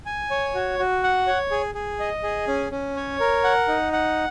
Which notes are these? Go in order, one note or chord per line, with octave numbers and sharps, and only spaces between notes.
G#5
C#5
F#4
F#4
F#5
C#5
G#4
G#4
D#5
G#4
C#4
C#4
C#5
A#4
F#5
D#4
F#5